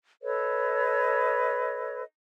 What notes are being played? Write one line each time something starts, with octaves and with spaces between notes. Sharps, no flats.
A4 B4 C#5 D#5